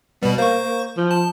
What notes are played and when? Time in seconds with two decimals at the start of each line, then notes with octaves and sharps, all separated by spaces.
0.23 B2 G3 B3
0.38 A#3 C5 C#6
0.65 A#3
0.97 F3
1.11 A5